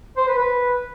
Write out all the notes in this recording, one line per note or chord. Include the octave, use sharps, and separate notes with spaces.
C5
B4
B4